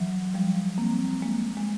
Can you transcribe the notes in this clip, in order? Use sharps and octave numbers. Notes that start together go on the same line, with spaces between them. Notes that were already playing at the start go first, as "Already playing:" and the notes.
Already playing: E3 F#3
F3 G3
A#3 C4
G#3 A#3
G#3